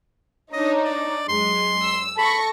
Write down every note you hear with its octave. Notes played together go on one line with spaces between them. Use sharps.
D4 D#4 C#5 D#5
D5
F#2 G#3 C6
E6
A4 B5 C#6 A#6